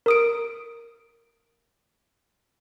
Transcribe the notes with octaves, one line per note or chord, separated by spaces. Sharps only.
A#4 D#6 D7